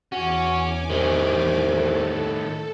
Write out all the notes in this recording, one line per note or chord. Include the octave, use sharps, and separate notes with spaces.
E2 C#4 F#4 G#5 D6
C2 A2 D#3
A4